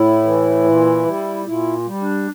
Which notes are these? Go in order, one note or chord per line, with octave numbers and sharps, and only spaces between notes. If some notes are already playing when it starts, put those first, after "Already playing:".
Already playing: A2 E4
E3
A#2
G3
A#2 E4
G3
D4